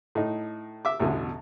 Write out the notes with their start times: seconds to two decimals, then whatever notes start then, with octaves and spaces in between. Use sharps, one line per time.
0.15 A2 D#4
0.85 E5 D6
1.00 A1 E2 B2 D3